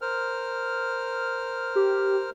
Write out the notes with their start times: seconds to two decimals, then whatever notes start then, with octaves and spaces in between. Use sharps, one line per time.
0.01 A#4 C5 F6
1.76 G4